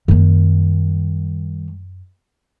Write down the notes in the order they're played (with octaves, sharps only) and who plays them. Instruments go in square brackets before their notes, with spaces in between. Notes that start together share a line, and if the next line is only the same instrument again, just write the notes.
[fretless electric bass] F#2 A#3 [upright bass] D#3 G3